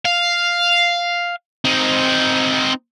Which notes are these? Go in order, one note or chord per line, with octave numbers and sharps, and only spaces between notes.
F5
C4 D#4